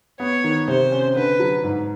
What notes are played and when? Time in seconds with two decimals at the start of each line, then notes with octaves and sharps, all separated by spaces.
0.20 B3 C#5
0.44 D#3
0.68 C3 C5
0.92 C#4
1.15 D3 B4
1.39 F#3
1.64 G#2